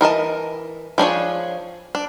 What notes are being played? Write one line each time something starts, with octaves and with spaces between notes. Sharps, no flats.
E3 A#4 D#5 A5
F3 D4 G#4 C#5
D4